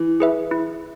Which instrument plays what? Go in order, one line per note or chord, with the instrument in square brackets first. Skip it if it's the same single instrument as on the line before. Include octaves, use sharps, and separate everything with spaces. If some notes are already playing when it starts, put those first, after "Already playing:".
Already playing: [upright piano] E3
[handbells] G#4 B4 E5
E4